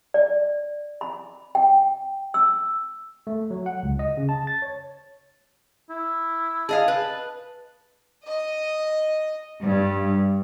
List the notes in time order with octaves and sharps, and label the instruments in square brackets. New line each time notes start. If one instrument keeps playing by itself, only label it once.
[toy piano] D5
B5
G5
E6
[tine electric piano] A3
F#3
F#5
C#2
D#5
C#3
A5
A6
C#5
[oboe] E4
[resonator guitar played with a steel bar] G#4 D#5 F5 [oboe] A5
[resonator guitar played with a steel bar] B4
[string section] D#5
G2